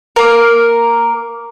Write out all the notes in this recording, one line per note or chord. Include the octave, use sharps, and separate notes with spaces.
A#3 A#4